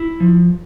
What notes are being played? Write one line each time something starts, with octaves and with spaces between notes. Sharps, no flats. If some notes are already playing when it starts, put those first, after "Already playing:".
Already playing: E4
F3